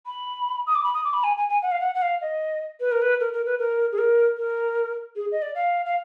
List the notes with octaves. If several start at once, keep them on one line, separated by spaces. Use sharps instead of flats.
B5
D#6
D6
B5
D#6
D6
B5
G#5
G#5
G#5
F#5
F5
F#5
F#5
F5
D#5
B4
A#4
B4
A#4
A#4
B4
A#4
G#4
A#4
A#4
G#4
D#5
D5
F5
F5